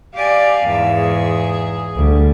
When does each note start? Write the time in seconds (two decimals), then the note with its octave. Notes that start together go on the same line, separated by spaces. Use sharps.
0.15 G4 D5 F5 G#5
0.65 E2 G#2 E5
0.96 G#4
1.97 D2 G3